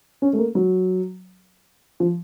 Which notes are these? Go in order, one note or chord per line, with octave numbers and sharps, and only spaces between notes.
C#4
A3
A#3
F#3
F3